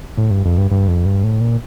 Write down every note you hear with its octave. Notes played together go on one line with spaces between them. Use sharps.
A2
G2
F2
G2
G2
F2
G2
A2
A#2